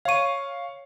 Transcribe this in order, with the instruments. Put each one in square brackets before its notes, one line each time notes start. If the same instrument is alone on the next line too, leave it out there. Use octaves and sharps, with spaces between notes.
[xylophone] C#5 D#7 [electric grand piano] F5 C#6